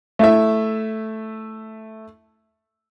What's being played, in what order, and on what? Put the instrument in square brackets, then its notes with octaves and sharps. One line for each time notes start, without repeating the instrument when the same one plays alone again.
[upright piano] A3 E4 E5